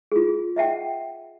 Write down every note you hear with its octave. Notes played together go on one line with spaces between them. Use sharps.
F4 G#4
D#5 E5 F#5 G5